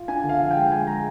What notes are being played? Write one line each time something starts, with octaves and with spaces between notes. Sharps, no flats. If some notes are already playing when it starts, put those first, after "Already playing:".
Already playing: F4
D4 G#5
D3
F5
F3
G5
G#3
G#3 G#5
G#3 A#5